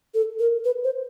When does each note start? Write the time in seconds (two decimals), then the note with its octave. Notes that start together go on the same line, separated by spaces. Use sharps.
0.14 A4
0.39 A#4
0.65 B4
0.84 C5